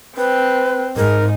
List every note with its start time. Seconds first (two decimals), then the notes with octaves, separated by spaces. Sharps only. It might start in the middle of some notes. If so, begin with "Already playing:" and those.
0.17 C4 B4
0.96 G#2 D#4 A#4